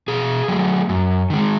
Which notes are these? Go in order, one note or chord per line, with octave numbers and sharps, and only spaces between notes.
B2 G#4
F#3 A3
F#2
D#3 G#3